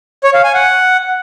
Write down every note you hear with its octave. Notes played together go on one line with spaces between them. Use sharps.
C#5
F5
G#5
F#5